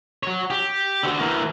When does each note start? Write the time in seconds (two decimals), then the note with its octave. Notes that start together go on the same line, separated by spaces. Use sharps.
0.23 F#4 C#5
0.50 G4
1.03 D3 F#4
1.20 E3 A#3